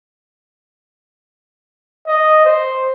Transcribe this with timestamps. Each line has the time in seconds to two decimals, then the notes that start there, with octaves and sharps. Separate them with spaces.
2.08 D#5
2.45 C5